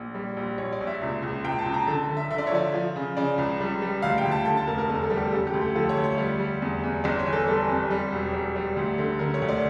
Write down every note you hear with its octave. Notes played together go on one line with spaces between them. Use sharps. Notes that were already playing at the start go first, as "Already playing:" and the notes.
Already playing: A#1
G3
A#1
A#1 C#5
D5
A#1
E5
C#2
C#2
C#2 G5
A5
C#2
A#5
D3 A5
D3
E5
D3 E5
D5
C#5
F3 D5
F3
C#3
C#3 D5
C#2
G3
G3
D2 F5
G5
D2
A5
D3 A5
A5
F1 A#4
A#4
E2 A4
A4
G3
G4
C#3 A4
G4
D2
A4
F3 A4
C#5
D2
C#5
G3 D5
G3
E2
E2
G1 D5
C#5
E3
A4
G3 A4
F2
G3
E1
G3
G3
D2
D3
D3 A#4
C#5
D2
D5